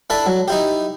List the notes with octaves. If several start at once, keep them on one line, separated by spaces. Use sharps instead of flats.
D4 E4 A4 A5 B5
F#3
D#4 E4 G4